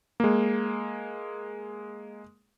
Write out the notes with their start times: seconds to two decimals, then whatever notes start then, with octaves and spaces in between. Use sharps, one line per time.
0.20 G#3 A#3